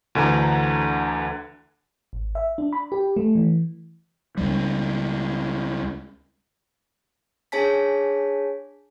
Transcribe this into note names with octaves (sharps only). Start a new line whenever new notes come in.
D2 D3 E3 A#5
G#1
E5
D4
B5
G4
A3
E3
C#2 G3
D4 G#4 C#5 G#5 A5 B6